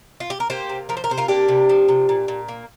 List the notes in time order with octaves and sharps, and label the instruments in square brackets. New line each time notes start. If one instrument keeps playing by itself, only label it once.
[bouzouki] F4
G4
A#4
A#3 G4 C5
C3
F3 A#4
C5
A#4
C3 C5
F4 A#4
A#3 D4 G4
C3
F3
C3
A#2
A#2
A#3